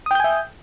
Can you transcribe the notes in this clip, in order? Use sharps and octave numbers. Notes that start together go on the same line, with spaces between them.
E5 G5 G#5 D#6 G6